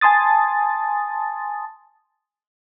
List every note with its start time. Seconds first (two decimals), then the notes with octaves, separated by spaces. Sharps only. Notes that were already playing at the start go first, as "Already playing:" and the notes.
0.01 G#5 A5 C6 D#6 A6